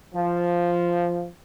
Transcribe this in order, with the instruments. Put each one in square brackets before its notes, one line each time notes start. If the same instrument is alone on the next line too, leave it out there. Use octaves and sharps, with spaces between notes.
[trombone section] F3